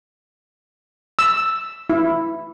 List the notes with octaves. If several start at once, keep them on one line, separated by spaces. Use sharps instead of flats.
E6
E4